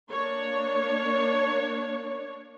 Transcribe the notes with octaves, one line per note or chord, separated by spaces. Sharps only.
A#3 D4 C#5